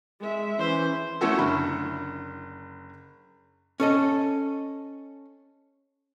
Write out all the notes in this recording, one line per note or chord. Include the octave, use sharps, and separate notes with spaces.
G#3 E5
E3 C#4 C5
A3 C#4 E4 F#4 A4
F#1 D3 B5
C#4 A4 D#5